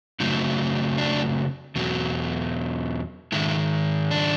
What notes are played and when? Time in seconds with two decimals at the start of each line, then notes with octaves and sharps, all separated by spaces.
0.20 F#2 C#3 F#3 A3 C4 D#4
0.98 D4
1.75 E2 B2 F#3
3.32 G#2 D#3 G#3 E4
4.11 D4